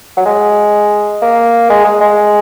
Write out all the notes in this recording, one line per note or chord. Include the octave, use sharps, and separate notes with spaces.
F#3
G#3
A#3
G#3
G#3
G#3